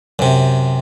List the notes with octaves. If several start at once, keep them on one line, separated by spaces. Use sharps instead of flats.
F#2 C3